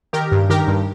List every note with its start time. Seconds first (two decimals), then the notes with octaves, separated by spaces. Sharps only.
0.13 D#3 G4 A#4
0.32 G2
0.50 D#3 G4 A#4
0.68 G2